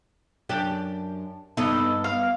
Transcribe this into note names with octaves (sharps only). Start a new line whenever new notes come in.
F#2 D4 G4
G2 B3 D#4 A4
F5